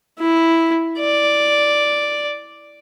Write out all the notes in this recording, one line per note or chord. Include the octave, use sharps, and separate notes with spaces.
E4
D5